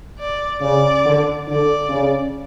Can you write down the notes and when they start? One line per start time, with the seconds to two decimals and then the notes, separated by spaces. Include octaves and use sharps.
0.19 D5
0.61 C#3 D5
1.05 D3
1.46 D3 D5
1.89 C#3